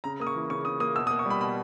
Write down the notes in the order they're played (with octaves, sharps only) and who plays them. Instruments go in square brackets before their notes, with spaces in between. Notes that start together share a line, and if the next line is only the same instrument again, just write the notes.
[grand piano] C#3 A#5
A#3 D#6
C#6
E3
C#3 C#6
C#3 D#6
A#3 D#6
B2 E6
D#6
A#3
C#6
G3 B5
B2 B5